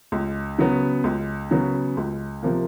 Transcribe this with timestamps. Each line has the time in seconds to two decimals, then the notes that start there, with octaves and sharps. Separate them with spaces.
0.12 C#2
0.58 C#3 F#3 B3
1.04 C#2
1.51 C#3 F#3 B3
1.97 C#2
2.43 C3 F3 A#3